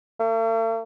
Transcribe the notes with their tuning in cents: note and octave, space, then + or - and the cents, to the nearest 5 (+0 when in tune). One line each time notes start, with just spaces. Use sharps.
A3 +45